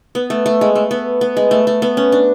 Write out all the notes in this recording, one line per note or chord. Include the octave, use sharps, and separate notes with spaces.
B3
A3
A3
G#3
A3
B3
B3
G#3
A3
A3
B3
C#4
D4